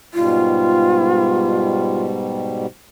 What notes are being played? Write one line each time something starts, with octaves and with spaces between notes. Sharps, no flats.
G#2 B2 G3 F4